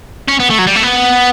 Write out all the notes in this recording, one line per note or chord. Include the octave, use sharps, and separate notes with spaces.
C#4
B3
A3
F#3
G3
A3
B3